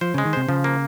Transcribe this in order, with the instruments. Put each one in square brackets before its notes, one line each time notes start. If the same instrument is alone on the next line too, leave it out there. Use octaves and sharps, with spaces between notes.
[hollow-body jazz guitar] F3 [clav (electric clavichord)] C5
[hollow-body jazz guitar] C#3 [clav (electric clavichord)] G#3
[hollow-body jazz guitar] D#3
[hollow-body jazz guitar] C3 [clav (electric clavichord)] C5
[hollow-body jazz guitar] C#3 [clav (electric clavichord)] F3
[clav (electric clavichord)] A#3